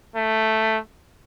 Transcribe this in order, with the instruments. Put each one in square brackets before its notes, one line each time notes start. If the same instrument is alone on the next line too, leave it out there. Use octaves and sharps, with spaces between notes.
[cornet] A3